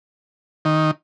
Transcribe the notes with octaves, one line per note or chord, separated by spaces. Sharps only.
D#3